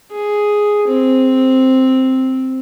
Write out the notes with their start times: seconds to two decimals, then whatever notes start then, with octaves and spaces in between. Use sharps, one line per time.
0.12 G#4
0.87 C4